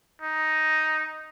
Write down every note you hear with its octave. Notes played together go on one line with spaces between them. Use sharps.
D#4